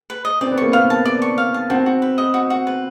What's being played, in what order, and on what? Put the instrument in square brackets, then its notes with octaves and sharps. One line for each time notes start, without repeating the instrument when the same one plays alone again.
[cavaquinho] B4
D#5
[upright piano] C4 [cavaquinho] D5
[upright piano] B3
[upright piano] A#3 [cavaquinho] C#6
[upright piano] B3 [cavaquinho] F5
[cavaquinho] A5
D5
C#6
F5
A5
[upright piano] C4 [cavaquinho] F#4
[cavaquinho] F#4
B4
D#5
F#4
F#4
B4